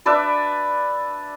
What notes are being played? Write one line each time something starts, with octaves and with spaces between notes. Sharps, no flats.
D4 B4 D5 E5